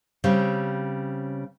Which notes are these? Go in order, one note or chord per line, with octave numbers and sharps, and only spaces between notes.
C#3 G3 C4